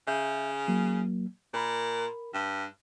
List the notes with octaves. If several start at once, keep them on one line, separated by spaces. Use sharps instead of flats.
C#3 E5 G6
F#3 A#3
A#2 A#4 B5
G2